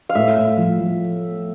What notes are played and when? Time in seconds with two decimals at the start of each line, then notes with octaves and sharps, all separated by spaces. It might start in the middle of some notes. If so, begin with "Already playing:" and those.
0.09 F5
0.15 A2 E5
0.37 A2
0.57 F3
0.79 F3